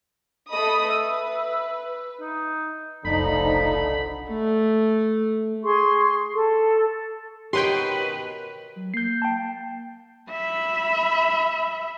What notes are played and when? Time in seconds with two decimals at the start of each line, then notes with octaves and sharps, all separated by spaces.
0.52 A3 D#5 B5 D#6
0.88 B4 E5
2.21 D#4
3.05 F1 B1 D3 F3 D#4 B5
4.30 A3
5.63 G#4 C6 C#6
6.34 A4
7.53 B2 D#3 C#4 G4 B4 C#5 G5 C6
8.76 F#3
8.94 A#3 G6 C7
9.22 G5 A5
10.31 E5 B5